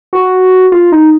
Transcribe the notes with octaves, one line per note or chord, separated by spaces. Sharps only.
F#4
F4
D#4